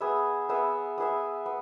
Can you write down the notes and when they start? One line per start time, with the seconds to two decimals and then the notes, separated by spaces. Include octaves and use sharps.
0.01 B3 G#4 B4 E5
0.49 B3 G#4 B4 E5
0.98 B3 G#4 B4 E5
1.46 B3